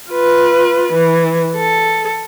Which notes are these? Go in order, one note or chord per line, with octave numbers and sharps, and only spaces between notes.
F4 B4
E3
A4